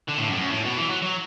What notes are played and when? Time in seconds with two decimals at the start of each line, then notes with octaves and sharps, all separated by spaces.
0.09 D3
0.18 A2
0.28 F#2
0.33 A2
0.39 F#2
0.51 A2
0.65 B2
0.77 E3
0.90 F#3
1.03 F#3